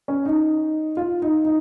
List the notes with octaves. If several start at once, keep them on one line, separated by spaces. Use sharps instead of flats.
C#4
D#4
F4
D#4
D#4